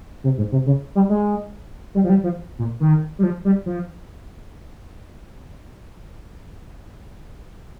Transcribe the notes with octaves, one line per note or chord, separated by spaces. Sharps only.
C3
G#2
C3
C#3
G3
G#3
G3
F3
G3
F3
A#2
D#3
G3
F3
G3
F3